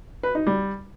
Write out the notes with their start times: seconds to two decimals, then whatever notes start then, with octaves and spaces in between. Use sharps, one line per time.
0.23 B4
0.35 D#4
0.47 G3